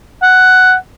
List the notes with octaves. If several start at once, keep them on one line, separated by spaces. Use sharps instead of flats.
F#5